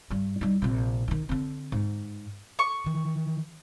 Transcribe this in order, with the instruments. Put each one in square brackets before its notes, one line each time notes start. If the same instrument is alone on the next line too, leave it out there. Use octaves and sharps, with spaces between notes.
[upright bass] G2 G3
G3 D#4
A#1 C3
D#3 D#4
D3 C4
G#2
[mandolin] C#6
[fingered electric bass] D#3 E3